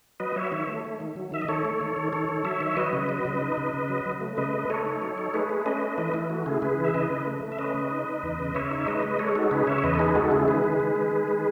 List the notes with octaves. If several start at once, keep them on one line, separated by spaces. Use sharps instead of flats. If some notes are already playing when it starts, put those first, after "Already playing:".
F#3 B4 D#5
F#3 C#5 E5
D#3 C#5 E5
A3
A3
D#3
F#3
D#3 E5
D#5
D#3 A4 C#5
A3
D#3
D#3
D#3 A4 C#5
D#3
F#3 C#5 E5
D#3
C#5
F#3 B4 D#5
C#3
F#3
C#3
D#4
C#3
C#3
F#3
F#3
A3
C#3 B4 D#5
A3
A3 A4 C#5
D#4
F#3
D#4
A3 G#4 B4
A3
C#4 B4 D#5
A3
E3 B4 D#5
E3 E4
A3 F#4
C#3 E4 G#4
C#3 G#4 B4
E3
E5
C#3 B4 D#5
C#3
A3
A3
E5
C#4 B4 D#5
C#3
D#4
D#4
E2
C#3
C#3 C#5 E5
D#4
G#3 B4 D#5
G#3
G#3 A4 C#5
D#4 F#4 A4
C#3 G#4 B4
C#3 C#5 E5
E2 B4 D#5
A4
D#4 G#4 B4
G#3 F#4 A4
C#3 E4 G#4
D#3 G#4 B4
G#3
D#3
G#3
D#3
G#3